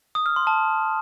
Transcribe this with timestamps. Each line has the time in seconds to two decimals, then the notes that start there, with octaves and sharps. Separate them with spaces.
0.15 D#6
0.26 F6
0.36 C6
0.47 A5